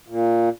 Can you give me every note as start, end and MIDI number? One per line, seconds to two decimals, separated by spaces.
0.08 0.49 46